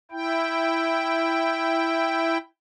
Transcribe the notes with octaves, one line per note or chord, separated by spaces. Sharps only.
E4 G5